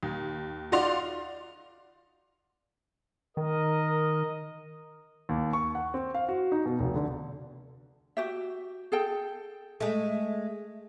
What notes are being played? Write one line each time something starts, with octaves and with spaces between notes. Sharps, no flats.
D#2
D#4 F4 F#4 D5 C6 F7
D#3 A#4 D#5
D#2
C#6
F#5
C4
F5
F#4
D#4
B2
F1
D3
F#4 G4 E5
G#4 A4 G5
G#3 A3